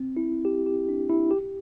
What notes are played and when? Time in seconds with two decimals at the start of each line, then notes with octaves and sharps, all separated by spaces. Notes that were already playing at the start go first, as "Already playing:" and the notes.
Already playing: C4
0.17 E4
0.45 G4
0.66 G4
0.89 D4
1.10 E4
1.31 G4